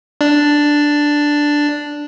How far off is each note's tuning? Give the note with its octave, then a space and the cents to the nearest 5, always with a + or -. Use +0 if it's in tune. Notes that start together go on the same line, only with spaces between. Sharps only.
D4 +0